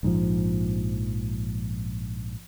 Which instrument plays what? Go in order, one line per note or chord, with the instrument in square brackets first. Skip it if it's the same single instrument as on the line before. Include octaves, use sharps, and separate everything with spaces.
[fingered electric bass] A#1 G#2 D3 F3